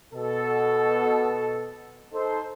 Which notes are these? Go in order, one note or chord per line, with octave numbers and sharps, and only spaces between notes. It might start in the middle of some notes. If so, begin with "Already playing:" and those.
B2 A4
D#4 A4 C5